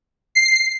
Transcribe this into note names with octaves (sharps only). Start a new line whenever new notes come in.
C7